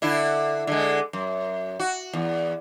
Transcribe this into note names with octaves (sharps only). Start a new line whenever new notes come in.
D3 E4
D3 G#3
F#2
F#4
E2